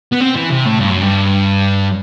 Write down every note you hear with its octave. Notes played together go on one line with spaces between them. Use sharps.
B3
C4
E3
C3
A2
G2
F#2
G2